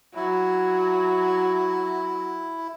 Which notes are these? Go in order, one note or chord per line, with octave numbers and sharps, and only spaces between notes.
F#3 E4